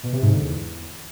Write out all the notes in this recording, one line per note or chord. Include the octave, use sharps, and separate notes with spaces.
B2
C3
G#2
D3
E2